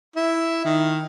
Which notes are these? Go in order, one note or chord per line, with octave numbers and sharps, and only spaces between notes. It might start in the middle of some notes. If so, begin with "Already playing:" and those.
E4
D#3